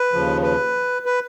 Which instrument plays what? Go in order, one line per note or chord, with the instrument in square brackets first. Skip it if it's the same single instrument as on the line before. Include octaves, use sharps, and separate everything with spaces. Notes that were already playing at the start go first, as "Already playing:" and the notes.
Already playing: [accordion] B4
D#2 C#3 F3
B4
B4